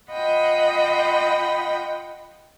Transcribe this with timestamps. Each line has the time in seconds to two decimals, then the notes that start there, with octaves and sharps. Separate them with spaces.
0.12 F4 D#5 F#5 G5 B5